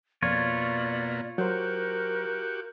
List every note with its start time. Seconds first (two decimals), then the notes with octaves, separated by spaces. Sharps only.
0.22 F2 B2 A#3 F4 C#5 D5
1.38 F#3 F#4 G4 A#4 C5